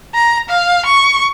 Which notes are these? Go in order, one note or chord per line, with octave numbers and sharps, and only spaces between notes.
A#5
F5
C#6